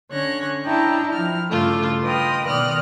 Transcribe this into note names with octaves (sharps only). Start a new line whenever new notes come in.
D3 C#4 C#5 F#6 A#6
D4 E4 D#5 G5 A5 A#5
F3 E4 F6
G2 C#3 A3 F4 D6
B4 D#5 G5 C6 D#6 F6
B2 D#3 D5 D#6 F6 F#6